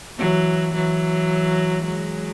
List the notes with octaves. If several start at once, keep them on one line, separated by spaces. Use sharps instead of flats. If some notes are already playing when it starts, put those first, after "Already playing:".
E3 F#3
E3 F#3
F#3 G#3